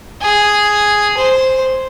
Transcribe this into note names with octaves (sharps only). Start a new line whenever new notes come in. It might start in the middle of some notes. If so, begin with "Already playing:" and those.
G#4
C5